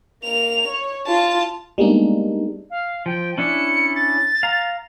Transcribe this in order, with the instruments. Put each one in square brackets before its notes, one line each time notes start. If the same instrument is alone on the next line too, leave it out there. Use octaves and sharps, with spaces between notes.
[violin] A#3 F7
C#5
F4 A5
[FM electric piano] G3 G#3 A#3 B3 D4 D#4
[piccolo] F5
[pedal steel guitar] F3 [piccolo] G5
[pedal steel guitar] C#4 D4 E4 [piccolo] C#7
[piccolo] A6
[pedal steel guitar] F5 A#5